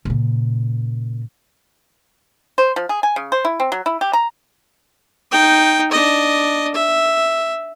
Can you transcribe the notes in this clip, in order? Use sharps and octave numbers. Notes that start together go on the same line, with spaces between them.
A#2 C#3
C5
F3
G#4
G#5
C#3
C5
E4
C4
F#3
E4
G4
A#5
D#4 G5
D4 D#5
E5